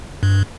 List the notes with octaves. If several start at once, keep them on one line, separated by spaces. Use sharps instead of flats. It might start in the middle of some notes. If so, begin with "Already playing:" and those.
G2